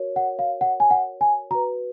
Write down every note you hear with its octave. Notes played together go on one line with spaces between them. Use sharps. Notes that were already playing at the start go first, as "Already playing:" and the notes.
Already playing: F#4 A#4 C#5
F#5
F5
F#5
G#5
F#5
G#5
F#4 B4 A#5